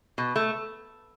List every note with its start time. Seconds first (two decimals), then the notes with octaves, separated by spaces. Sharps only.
0.18 B2
0.36 A3